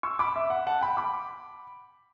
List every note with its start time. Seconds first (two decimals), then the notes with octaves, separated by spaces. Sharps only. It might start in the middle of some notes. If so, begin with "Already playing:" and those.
0.03 C#6 E6
0.19 B5 D6
0.36 E5
0.50 F#5
0.67 F#5 A5
0.81 G5 B5
0.97 B5 D6